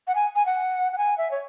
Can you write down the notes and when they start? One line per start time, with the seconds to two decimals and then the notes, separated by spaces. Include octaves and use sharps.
0.08 F#5
0.15 G#5
0.36 G#5
0.46 F#5
0.93 F#5
0.98 G#5
1.18 E5
1.31 C#5